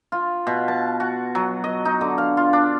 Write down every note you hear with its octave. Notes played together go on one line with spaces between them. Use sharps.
F4
B2
A5
F#4
F#3
D#5
D#4
D3
F5
F4
D4